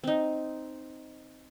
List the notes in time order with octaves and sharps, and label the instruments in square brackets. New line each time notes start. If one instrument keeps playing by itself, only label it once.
[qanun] C4 D#4